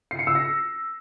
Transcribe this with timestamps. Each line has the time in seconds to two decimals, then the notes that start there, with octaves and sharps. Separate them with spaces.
0.11 C7
0.19 C#7
0.27 E6
0.35 A#6